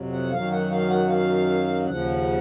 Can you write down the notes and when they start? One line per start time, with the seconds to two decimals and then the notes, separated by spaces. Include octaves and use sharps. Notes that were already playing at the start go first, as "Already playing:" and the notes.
Already playing: F2 C3 F#3
0.12 F#5
0.32 F#2 D#3 F#3 F5
0.51 F#5
0.71 F5
0.90 F#5
1.09 F5
1.86 D#2 C#3 F3 F#5